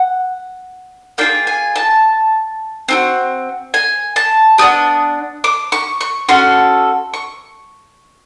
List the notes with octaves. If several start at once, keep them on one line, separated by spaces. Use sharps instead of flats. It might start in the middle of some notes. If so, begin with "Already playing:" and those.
Already playing: F#5
A#3 D4 F4 G#4 G5
G#5
A5
C4 D#4 F#4
G#5
A5
B3 D4 G4 D#6
D6
C#6
C#6
C#4 F#4 A4 C6
C#6